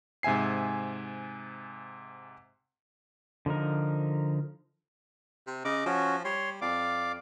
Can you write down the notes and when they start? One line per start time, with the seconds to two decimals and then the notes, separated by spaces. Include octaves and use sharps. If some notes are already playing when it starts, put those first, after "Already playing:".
0.23 G#2 C3 E5 G#5 C7
3.46 D3 F3 D#4 A#4
5.47 C3
5.65 C#3 D#5 D6
5.86 F3 C#4 F#4
6.25 G3 C#5 C6
6.62 F2 D5 F5 D6